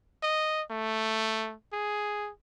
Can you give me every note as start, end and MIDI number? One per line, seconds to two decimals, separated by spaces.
0.23 0.62 75
0.71 1.54 57
1.73 2.30 68